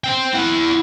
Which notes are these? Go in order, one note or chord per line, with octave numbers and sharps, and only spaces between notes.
C5 G5
E4 F#5